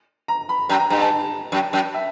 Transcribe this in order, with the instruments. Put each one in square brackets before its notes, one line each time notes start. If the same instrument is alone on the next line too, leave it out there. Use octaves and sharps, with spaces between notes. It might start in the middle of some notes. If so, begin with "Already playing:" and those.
[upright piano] A#5
B5
[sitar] F#2 [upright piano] A#5
[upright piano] A#5
[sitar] G2 [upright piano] A#5
[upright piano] A5
[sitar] F#2
F#2
[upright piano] E5